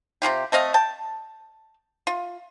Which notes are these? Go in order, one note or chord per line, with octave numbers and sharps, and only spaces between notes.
C3 F3 F4 G4
A3 C4 D#5 F5
G5 A5
F4